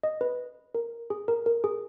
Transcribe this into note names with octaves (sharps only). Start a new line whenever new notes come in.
D#5
B4
A#4
G#4
A#4
A#4
G#4